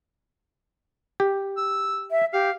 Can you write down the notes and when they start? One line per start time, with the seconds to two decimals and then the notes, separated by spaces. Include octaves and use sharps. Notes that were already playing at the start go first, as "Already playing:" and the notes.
1.20 G4
1.57 E6
2.11 E5
2.33 G4 F5